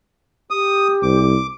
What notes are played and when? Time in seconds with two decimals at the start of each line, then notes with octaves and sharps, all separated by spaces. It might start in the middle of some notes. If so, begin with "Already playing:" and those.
0.50 G4 D#6
1.03 C2 D6